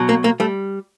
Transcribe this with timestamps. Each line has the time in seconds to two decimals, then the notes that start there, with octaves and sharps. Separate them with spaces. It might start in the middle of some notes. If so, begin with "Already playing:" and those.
Already playing: B2 F#3
0.09 A#3
0.24 A#3
0.40 G3 A3